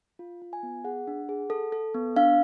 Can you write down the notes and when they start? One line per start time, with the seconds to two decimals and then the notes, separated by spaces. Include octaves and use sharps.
0.19 F4
0.42 F4
0.53 G#5
0.63 B3
0.84 G#4 F#5
1.07 D4
1.29 G#4
1.50 A4
1.72 A4
1.94 B3
2.16 D4 F5